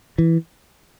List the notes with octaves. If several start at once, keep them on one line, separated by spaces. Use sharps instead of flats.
E3